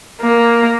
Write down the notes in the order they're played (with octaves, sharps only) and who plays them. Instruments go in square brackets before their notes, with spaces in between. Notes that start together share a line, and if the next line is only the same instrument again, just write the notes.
[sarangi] A#3